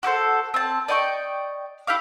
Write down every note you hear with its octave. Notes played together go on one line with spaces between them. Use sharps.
F#4 G4 A4 C5
C4 A5
D5 D#5 G5 C#6
E4 G4 F5 D6